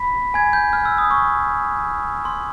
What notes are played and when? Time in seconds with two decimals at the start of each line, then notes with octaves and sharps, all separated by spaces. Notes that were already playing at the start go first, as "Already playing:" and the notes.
Already playing: B5 B6
0.34 G#5 G#6
0.53 G6
0.73 F6
0.85 E6
0.98 D#6
1.11 C#6
2.25 C6